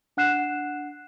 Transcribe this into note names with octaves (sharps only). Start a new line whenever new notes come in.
D4 F#5 F#6 C7 E7